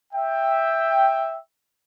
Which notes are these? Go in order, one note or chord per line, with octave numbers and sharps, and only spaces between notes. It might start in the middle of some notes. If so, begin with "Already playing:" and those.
E5 G5